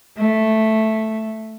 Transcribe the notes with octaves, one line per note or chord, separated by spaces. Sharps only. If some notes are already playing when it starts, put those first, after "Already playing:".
A3